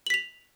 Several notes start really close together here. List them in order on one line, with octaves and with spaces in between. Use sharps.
F#7 B6 F7